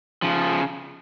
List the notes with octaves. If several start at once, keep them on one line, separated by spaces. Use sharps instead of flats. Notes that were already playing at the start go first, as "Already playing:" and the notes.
C#3 F3